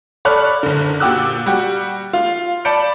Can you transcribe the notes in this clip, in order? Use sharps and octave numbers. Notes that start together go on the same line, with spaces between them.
A4 C#5 D5 B5 F6 F#6
F#1 D3
A#2 F#4 G4 D6 E6 F#6
G3 F#4 G4
F4
D5 A5 B5 G6 C#7 D7